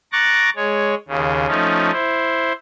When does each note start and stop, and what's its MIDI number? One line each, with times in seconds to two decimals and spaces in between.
0.12 0.50 82
0.12 0.50 85
0.12 0.50 86
0.12 0.50 90
0.12 0.50 93
0.12 0.50 94
0.56 0.94 56
0.56 0.94 73
1.08 1.46 39
1.08 1.46 49
1.47 1.91 53
1.47 1.91 57
1.47 1.91 61
1.47 1.91 63
1.92 2.52 64
1.92 2.52 72